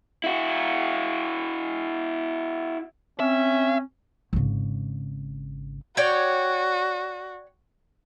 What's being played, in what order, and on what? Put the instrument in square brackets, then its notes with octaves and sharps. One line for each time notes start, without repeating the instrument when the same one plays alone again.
[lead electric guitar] E4 F#4
[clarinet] C4 [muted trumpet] C#4 [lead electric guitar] E5
[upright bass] G#1 C#3
[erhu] F#4 [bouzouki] C#5 D5 G5